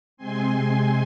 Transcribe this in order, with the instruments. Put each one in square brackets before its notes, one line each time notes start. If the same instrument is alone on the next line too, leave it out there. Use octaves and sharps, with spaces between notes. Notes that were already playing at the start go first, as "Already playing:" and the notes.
[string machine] C3 G#3 C4 G#5 C6